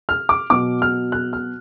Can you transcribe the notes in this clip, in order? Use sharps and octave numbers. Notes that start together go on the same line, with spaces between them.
F6
D6
B2 F#3 D6
F6
F#6
F6